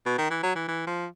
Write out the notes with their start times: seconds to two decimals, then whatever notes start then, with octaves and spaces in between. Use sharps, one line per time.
0.06 B2
0.18 D#3
0.30 E3
0.43 F#3
0.55 E3
0.68 E3
0.87 F3